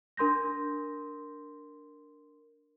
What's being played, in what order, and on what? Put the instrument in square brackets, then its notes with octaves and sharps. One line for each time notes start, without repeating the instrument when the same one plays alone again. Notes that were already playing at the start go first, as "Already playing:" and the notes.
[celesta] D4 A#4 C6 G6 A#6